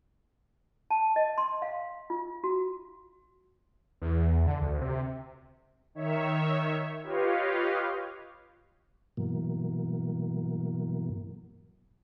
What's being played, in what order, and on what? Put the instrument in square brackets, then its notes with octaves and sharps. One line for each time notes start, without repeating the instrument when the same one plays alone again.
[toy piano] A5
D#5
C6
F5
F4
F#4
[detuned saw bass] E2
D3
D2
C3
[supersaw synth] D#3 C#5 E5
F4 G4 B4 C#5 D#5 F5
[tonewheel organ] G2 B2 E3 F#3 A#3